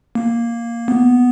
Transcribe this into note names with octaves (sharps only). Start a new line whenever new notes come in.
A#3
B3